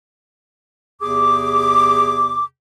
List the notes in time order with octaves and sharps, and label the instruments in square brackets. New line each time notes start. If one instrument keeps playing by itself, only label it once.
[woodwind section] E2 C3 G#4 D6